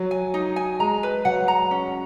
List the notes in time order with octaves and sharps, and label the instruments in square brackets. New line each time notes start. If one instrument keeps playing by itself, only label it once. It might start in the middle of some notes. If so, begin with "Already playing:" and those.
Already playing: [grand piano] F#3
[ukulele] G#5
D#4
G#5
[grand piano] G#3 [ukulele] A#5
[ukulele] B4
[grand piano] F#3 [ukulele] F#5
[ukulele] A#5
C#4